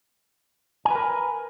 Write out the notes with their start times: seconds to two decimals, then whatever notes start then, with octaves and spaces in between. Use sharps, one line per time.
0.85 G#5
0.90 B4
0.95 A#4